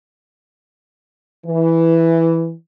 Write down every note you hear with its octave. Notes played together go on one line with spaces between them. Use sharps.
E3